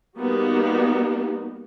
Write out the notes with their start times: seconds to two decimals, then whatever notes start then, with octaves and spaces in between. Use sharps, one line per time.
0.19 G3 A#3 B3 D#4 F#4 G4